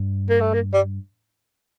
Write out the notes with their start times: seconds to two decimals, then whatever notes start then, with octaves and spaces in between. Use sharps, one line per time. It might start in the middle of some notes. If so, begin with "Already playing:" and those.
Already playing: G2
0.29 A#3
0.41 A3
0.54 A#3
0.74 G3